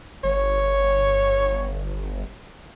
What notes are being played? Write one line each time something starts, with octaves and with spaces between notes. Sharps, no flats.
G1 C#5